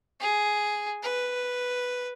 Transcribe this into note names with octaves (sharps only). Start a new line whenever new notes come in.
G#4
B4